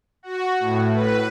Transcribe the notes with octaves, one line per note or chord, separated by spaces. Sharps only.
F#4
A2
B4